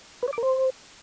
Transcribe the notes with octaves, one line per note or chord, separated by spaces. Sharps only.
B4
C#5
D6
A#4
C5